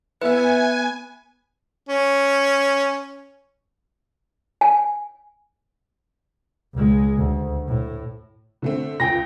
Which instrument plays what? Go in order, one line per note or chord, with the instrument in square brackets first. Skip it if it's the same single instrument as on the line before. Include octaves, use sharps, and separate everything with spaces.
[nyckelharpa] B3 [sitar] E4 E5 [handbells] B4 [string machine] G#5
[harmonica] C#4
[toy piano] G#5
[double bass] C#2 G#3
D2
A2
[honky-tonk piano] D3 A3 C4
[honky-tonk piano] C#2 [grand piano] G5 A#6